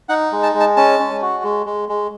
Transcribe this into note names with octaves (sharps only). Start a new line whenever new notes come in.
D#4 F#5
G#3
A5
G#3
A5
C#4 A5
C#4
F#4
G#3
G#3
G#3